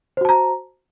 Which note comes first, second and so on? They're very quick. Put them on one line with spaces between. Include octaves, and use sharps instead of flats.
C5 F#4 A5 A#5